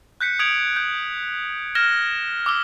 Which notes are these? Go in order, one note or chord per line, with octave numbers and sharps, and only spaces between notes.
F#6 G6 B6 C#7
D#6 G#6 D7 F7 F#7
G6
F6 G#6 A#6 E7 G7
D6 E6 G7